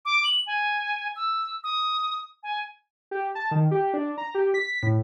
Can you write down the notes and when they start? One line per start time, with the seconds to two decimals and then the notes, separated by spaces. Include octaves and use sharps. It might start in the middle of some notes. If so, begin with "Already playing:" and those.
0.05 D6
0.24 F#7
0.47 G#5
1.16 E6
1.64 D#6
2.43 G#5
3.11 G4
3.35 A5
3.51 D#3
3.71 G4
3.94 D4
4.18 A#5
4.35 G4
4.54 B6
4.83 A2